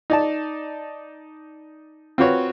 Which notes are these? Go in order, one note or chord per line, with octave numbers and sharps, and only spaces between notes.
D#4 D5 A5
C4 F4 F#4 B4 C#5